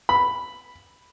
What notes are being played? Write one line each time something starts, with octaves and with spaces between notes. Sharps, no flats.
B5